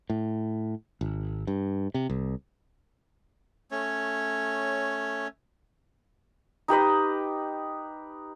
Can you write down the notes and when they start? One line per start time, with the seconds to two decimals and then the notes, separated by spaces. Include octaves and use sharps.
0.10 A2
1.01 G#1
1.47 G2
1.94 C3
2.10 C2
3.71 A3 C#4 C#5
6.68 D#4 G4 B4 D#5